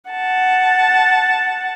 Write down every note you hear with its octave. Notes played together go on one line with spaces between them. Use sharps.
F#5 A5